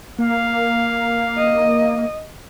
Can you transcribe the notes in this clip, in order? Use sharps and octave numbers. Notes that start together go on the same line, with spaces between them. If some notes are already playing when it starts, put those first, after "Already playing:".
A#3 F5
D#5